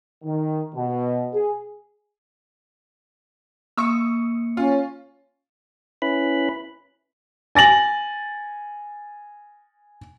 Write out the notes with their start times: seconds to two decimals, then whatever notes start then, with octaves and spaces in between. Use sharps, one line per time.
0.24 D#3
0.75 B2
1.33 G#4
3.77 A#3 C#6 D#6 E6 C#7
4.57 C#4 F4
6.02 C#4 E4 B4 B5
7.55 G#5 A6 A#6 F#7